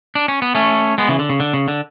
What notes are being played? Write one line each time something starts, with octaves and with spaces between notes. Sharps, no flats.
D4
C#4
B3
A3 C#4
G#3 B3
C#3 E3
D3
C#3
D3
C#3
D3